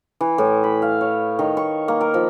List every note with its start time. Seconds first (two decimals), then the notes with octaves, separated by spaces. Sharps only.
0.21 E3
0.38 A2
0.64 B5
0.82 F5
1.01 C#5
1.39 D#3
1.57 C#6
1.88 A#3
2.01 A#4
2.14 F3